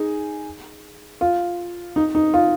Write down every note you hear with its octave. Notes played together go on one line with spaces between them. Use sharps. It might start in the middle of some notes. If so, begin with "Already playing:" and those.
Already playing: D#4 G#4
F4
D#4
D#4
F4